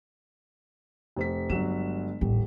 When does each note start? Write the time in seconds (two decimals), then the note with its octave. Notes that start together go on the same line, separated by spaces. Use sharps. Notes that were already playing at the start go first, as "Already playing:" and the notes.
1.16 F1 C5 B6
1.50 G1 F#3 G#3 E7
2.21 D#1 A1